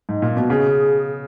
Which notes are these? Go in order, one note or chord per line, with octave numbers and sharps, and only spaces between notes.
G#2
A#2
B2
C#3 G#4